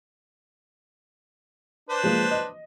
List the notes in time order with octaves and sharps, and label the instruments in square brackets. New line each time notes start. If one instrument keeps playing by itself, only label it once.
[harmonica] D4 B4 C5
[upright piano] F3 G#3 A#3
D#5